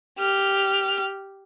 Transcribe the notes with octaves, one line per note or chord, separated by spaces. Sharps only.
G4 F6